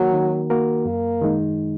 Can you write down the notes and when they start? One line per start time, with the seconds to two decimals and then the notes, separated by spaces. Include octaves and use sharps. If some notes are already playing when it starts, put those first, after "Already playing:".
Already playing: D#3 F#3 A#3 F#4 A#4
0.13 D#3
0.50 A#3 F#4 A#4
0.86 F#2 A#3
1.21 D#3 G#3 D#4